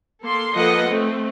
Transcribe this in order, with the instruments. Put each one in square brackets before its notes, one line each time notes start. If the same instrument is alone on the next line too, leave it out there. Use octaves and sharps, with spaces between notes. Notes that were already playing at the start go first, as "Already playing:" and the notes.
[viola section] A#3 A4 C6
F3 A#3 A4 B4 D#5 F#5
A3 C4